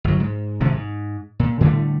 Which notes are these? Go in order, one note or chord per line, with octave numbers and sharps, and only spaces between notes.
G1 F#3
G#2
G#1 C3 F3 G#3
G#2
A#2
A2 D3 G3 A3